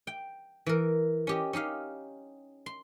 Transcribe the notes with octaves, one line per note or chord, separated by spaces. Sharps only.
G5
E3 A#4
C#4 G4 D#5
C#4 D#4 G4 F5
C6